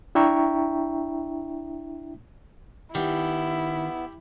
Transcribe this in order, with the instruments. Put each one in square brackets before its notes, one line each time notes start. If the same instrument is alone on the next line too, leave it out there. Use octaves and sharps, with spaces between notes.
[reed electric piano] D4 E4 E5 G5 A#5 C#6
[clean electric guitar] D#3 [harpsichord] G3 [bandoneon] B3 [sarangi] E4